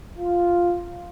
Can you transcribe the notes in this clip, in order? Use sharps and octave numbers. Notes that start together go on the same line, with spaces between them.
F4